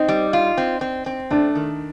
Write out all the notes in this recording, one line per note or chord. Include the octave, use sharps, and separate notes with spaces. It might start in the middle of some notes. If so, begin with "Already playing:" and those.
Already playing: C4 D#4
G3
F4
C4
C4
C4
A3 D4
D#3